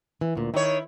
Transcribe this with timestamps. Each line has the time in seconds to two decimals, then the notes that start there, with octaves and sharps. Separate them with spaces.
0.21 E3
0.35 D2 A#2
0.54 D#3 E4 C#5